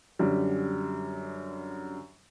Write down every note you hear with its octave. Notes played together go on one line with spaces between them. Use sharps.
F#2 D3 G3